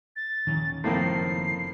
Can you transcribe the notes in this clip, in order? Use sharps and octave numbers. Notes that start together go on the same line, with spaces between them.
A6
D#1 D#3 C#4
F#1 A2 D#3 F3 A#3 C4 C7